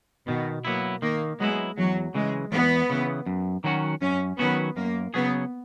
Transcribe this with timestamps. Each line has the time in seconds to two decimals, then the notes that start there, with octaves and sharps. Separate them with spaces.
0.28 B2 D#3
0.65 F#3 A#3 B3 E4
1.02 D#3 A#3
1.40 F#3 G#3 B3 E4
1.78 E2 F#3
2.15 C#3 E3 G#3
2.52 E2 B3
2.90 C#3 E3
3.26 F#2
3.64 D#3 F#3 C#4 F#4
4.01 F#2 C#4
4.39 D#3 F#3 B3 C#4 F#4
4.76 F#2 A#3
5.14 C#3 F#3 B3 C#4 G#4